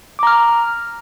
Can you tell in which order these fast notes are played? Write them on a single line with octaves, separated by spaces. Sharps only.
D6 A#5 F6